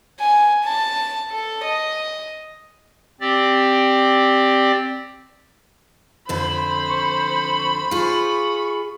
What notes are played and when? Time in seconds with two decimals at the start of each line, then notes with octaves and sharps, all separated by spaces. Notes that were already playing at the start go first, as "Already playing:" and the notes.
0.20 G#5
0.64 A5
1.31 A4
1.64 D#5
3.21 C4 G4 D5
6.29 F2 D3 C5 B5
6.90 C#6
7.91 F4 G#4 C#6